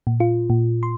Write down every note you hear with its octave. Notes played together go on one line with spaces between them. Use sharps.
A#2
F4
A#2
C6